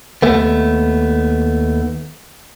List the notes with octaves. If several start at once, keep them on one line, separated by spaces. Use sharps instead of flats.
D#2 A3 B3